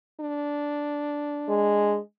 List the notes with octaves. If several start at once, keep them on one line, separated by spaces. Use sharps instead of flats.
D4
G#3